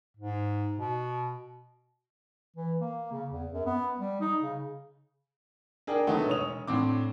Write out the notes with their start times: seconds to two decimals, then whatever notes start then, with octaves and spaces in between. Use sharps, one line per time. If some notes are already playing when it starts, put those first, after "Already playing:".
0.17 G#2
0.78 B2
2.56 E3
2.80 A#3
3.12 C#3
3.30 E2
3.53 F#2
3.66 B3
3.99 G3
4.21 D#4
4.42 C#3
5.87 D4 G#4 A#4 G5
6.07 D3 F#3 A3 B3 D#4
6.27 E1 C#5 D#6 F7
6.67 A2 D3 C4 D6